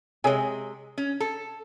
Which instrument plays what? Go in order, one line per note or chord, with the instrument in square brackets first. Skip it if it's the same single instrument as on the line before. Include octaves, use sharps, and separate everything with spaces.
[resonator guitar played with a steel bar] C3 G#3 [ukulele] G#4 C#5 G#5
[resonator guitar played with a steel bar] C#4
A4